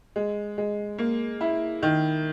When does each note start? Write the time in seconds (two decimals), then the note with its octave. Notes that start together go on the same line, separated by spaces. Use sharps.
0.16 G#3
0.58 G#3
0.98 A#3
1.41 E4
1.83 D#3